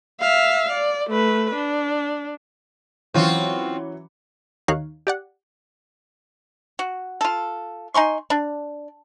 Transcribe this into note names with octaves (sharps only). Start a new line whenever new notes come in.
E5 F5
D5
A3 B4
D4
E3 F#3 C4 C#4 F4 F#4
D#2 D#4 C#5 F5 F#6
G4 D5 F#5
F#4
F4 A4
D#4 G#5 C6 C#6
D4